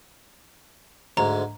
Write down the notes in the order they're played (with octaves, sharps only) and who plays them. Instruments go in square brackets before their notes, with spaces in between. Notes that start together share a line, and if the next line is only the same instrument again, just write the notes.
[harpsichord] D2 G#2 [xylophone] A#5